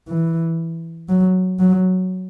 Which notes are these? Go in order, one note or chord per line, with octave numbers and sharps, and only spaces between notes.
E3
F#3
F#3